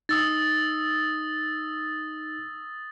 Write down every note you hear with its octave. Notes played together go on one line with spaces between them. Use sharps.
D#4 D#6 E6 A6